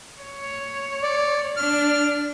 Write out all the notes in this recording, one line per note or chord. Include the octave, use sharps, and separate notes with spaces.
C#5
D5
D4 F6